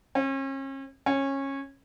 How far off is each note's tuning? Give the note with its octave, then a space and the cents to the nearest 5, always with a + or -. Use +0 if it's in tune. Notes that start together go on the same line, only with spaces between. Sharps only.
C#4 -40
C#4 -20